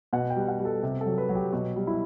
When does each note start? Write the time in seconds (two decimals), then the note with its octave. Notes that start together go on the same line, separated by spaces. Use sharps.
0.13 B2 F#5
0.30 G5
0.36 G3
0.48 F#5
0.59 G3
0.65 A4
0.83 C3 G4
1.01 A4
1.06 F#3
1.18 B4
1.29 F#3
1.35 G4
1.52 B2 F#4
1.76 G3
1.87 E4